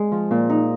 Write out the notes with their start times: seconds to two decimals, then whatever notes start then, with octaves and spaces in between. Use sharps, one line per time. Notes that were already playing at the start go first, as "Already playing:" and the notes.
Already playing: G#3
0.12 F3
0.31 A#2
0.50 D#4